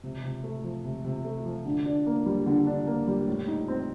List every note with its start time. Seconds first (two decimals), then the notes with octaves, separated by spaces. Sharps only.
0.03 C3
0.24 C3
0.44 A3
0.64 F3
0.84 C3
1.04 C3
1.25 A3
1.45 F3
1.66 D3
1.86 D4
2.06 A#3
2.26 G3
2.46 D3
2.67 D4
2.87 A#3
3.07 G3
3.28 A2
3.48 D#4
3.68 C4